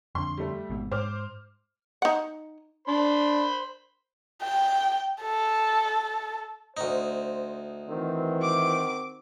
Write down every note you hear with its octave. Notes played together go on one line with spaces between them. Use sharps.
F2 D3 C6
G3 A3
G#1 G#2 B2
G#2 C5 D6 F6
D#4 F#5
D4 C5 B5 C6
G5
A4
D2 D#4 C5
D#3 E3 C4 F#4
D6